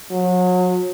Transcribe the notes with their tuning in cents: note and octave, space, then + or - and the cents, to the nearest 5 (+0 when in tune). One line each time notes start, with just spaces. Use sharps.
F#3 -35